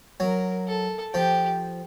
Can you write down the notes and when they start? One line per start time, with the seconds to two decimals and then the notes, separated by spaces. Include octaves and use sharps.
0.20 F#3 A#4
0.67 A4
1.13 F3 G4